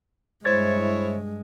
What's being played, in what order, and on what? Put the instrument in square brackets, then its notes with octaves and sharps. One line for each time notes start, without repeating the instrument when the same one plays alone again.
[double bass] G2 G#3 [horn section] E4 C#5 [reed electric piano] C5 G#6 A6